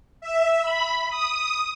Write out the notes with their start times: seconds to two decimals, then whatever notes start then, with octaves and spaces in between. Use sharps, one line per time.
0.21 E5
0.62 B5
1.09 D#6